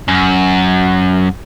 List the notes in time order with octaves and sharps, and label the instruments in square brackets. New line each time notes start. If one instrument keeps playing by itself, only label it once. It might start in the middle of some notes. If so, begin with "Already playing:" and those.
[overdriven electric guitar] F#2